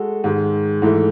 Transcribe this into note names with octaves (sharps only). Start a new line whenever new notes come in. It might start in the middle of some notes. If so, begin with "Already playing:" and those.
Already playing: G#3 F#4 A4
G#2 D#3 G#3
G#2 E3 A3 E4